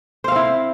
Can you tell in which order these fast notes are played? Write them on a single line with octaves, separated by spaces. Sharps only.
C5 F5 C4 E4